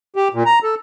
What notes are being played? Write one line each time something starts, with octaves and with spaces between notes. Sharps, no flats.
G4
A#2
A#5
A4